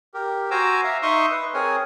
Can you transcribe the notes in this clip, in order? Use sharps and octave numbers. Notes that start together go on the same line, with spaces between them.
G4 A#4
F#4 C5 G#5 A#5 D6 E6
E5 F5 A#5
D#4 E5 C6 C#6 D#6
B4
C4 G#4 A#4 C#5 G#5